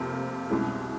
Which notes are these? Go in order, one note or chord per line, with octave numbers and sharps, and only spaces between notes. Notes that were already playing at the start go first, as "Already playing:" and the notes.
Already playing: F1 F2 C3 F3 A#3
C2 B2 G#3 C#4 E4